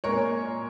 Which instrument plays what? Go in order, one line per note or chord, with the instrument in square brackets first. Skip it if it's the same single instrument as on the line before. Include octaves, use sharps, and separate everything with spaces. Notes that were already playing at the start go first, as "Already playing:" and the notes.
[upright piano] A#2 G#3 A#4 C#5